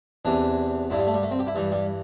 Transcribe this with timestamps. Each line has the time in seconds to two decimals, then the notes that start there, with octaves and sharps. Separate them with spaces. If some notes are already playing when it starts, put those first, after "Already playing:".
0.25 E2 C3 E3 D4
0.90 G2 D3 E4
0.99 G3
1.07 A3
1.14 G3
1.23 A3
1.31 C4
1.39 G4
1.47 E4
1.55 G2 E3 G3
1.72 G3